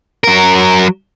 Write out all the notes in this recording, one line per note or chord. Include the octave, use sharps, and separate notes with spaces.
F#3 A#4